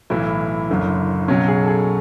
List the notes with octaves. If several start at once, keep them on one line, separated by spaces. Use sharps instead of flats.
B1 A2 E3 E4
F#1 F#2 D3
B1 B2 F#3 C#4
G#4
A4
G#4